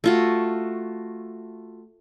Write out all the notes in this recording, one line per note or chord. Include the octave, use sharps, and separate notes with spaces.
A3 F4 F#4